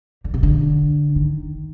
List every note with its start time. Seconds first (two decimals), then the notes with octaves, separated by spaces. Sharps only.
0.24 D3
0.34 C3
0.43 D3
1.16 D#3